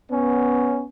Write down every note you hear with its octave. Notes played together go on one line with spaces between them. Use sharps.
B3 C#4